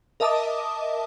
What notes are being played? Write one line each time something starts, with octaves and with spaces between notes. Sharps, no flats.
A#4 D#5 E5 A5 D6 D#6